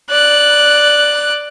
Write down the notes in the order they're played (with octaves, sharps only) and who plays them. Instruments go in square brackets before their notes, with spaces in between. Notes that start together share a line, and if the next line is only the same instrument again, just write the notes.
[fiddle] D5 F#6